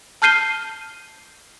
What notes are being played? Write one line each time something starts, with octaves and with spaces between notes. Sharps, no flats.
A5 F6 G6 C7 D#7 G7